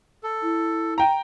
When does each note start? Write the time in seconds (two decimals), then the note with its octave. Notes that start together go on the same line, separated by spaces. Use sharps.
0.23 A4
0.42 E4
0.98 G5 A#5